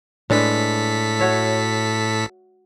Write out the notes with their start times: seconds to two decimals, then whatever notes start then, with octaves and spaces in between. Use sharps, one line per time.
0.30 A2 G#3 D4 A4 B4 B6
1.19 F#4 C#5 E5